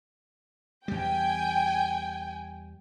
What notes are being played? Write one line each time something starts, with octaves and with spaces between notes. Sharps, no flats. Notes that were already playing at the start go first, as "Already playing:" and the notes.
E2 G3 G5 G#5